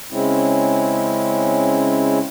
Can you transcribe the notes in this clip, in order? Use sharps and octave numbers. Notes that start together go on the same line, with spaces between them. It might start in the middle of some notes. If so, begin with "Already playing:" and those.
C#3 G#3 C4 C#4 E4